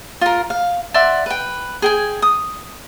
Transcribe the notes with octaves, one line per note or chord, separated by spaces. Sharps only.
F4 A#4
F5
D5 E5 F#5 C6
B4 G5
G#4 G5 G#5
D#6